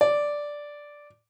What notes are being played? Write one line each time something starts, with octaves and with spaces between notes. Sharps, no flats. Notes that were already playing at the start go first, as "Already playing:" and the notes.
D5